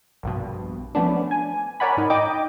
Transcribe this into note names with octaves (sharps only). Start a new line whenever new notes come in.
A#1 G2 B2
F3 A3 B3 C#4 D4
G#5
A#4 C#5 D5 F#5 G#5 B5
G#2 D#4
D#4 D#5 G5 D6